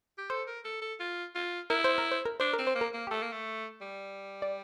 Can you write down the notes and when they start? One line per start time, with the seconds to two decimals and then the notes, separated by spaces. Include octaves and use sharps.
0.18 G4
0.30 A4 C5
0.47 A#4
0.65 A4
0.82 A4
1.00 F4
1.35 F4
1.70 E4 A#4
1.84 C5
1.98 A#4
2.12 C5
2.25 A#4
2.40 D4 C5
2.53 A#4
2.59 C4
2.67 C5
2.75 A#3
2.81 A#4
2.94 A#3
3.07 G4
3.11 A3 A4
3.22 A#3
3.32 A3
3.81 G3
4.42 D5